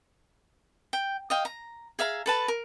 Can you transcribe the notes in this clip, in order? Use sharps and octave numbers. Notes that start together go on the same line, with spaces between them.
G5
D#5 F5 G5
A#5
G#4 E5 F5 A#5
A4 B4 A5
A#4